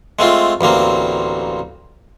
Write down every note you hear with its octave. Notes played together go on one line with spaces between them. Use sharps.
G#3 A3 C4 F4
A1 D2 A#3 C4